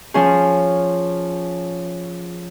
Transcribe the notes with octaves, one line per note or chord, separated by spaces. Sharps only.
F3 C#4 G#4